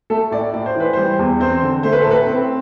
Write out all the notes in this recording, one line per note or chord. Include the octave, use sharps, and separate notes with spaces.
A3 A4
A2 D5
A2 D5
C5
E3 B4
G3 C5
E2
C4 C5
D3
A3 C5
B4
A2 A4
B4
C4